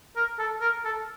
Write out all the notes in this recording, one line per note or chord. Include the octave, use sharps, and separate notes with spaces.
A#4
A4
A#4
A4